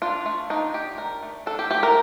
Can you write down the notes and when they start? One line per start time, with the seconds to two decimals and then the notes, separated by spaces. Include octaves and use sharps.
0.02 D4 F4
0.26 A3
0.50 D4 D#4
0.74 A3 G4
0.98 D4 A#4
1.22 A3
1.46 D4 A4
1.59 G4
1.71 A3 G4
1.83 A#4